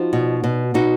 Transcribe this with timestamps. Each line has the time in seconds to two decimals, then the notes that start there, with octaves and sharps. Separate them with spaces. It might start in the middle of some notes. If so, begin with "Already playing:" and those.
Already playing: F3 D#4 F#4
0.13 B2
0.44 B2
0.74 B2 D#4 F#4